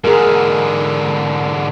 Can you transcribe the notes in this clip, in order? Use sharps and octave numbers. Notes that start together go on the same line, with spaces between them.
G#2 D3 G#4 A#4